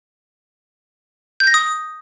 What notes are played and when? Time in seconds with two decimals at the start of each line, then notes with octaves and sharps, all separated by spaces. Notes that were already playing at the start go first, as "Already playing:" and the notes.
1.40 G6
1.47 A#6
1.54 D#6